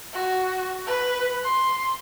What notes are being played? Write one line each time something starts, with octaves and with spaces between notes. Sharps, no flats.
F#4
B4
C6